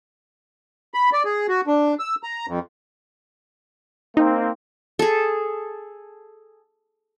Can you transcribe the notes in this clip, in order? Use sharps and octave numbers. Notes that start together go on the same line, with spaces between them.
B5
D5
G#4
F#4
D4
E6
A#5
F2
A#3 C4 D#4
G#4 A4